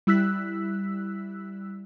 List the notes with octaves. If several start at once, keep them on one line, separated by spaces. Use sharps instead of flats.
G3 E4 E6 F#6 B6